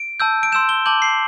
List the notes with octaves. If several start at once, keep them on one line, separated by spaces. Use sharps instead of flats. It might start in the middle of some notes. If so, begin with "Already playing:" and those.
Already playing: D7
A5 E6 G6
D7
C6 E6 G6 E7
G7
A5 D6 G6 F#7
C7